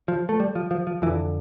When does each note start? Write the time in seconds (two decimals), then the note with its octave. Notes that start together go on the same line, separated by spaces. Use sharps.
0.08 F3
0.29 A3
0.40 G3
0.55 F3
0.71 F3
0.87 F3
1.02 F2 E3
1.07 D3